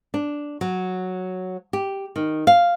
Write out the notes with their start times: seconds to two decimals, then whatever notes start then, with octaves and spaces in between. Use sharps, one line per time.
0.14 D4
0.61 F#3
1.73 G4
2.16 D#3
2.47 F5